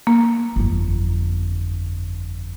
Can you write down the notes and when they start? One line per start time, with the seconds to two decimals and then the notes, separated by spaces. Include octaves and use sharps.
0.07 A#3
0.56 G1 F2